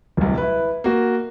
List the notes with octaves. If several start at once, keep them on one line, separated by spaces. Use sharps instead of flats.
D1 C2
E4 B4
A#3 F#4